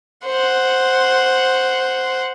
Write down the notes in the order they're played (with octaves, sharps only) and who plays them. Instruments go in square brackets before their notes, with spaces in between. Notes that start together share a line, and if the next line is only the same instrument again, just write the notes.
[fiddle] C5 F#5